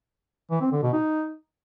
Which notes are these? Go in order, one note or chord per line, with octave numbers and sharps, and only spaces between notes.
E3
C4
D3
B2
D#4